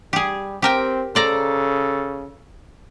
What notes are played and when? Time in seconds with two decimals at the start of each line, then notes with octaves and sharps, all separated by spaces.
0.13 G3 G4 G#4
0.62 C4 G4 A#4 G5
1.15 C#3 A4 C5 D5 A#5